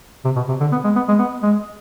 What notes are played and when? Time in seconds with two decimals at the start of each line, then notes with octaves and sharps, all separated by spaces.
0.25 C3
0.36 B2
0.48 C3
0.60 D3
0.72 B3
0.84 G#3
0.96 B3
1.08 G#3
1.19 B3
1.43 G#3